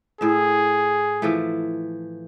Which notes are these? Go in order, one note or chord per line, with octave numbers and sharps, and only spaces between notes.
A2 G#4 E5
E3 F3 A3